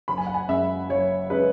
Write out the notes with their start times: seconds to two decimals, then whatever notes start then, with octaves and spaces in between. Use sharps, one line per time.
0.08 F#1 B5
0.18 G#5
0.27 F#5
0.34 G#5
0.48 F#2 C#3 G#3 E5
0.89 F#1 C#5
1.30 C#3 G#3 B4